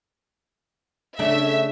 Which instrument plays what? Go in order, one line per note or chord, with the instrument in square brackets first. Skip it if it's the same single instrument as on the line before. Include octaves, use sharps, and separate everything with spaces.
[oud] C#3 A3 D4 [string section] E5